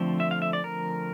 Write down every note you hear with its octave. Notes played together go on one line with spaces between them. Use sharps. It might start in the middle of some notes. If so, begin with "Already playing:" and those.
Already playing: D3 F3 A3 C4
E5
F5
E5
D5
A#4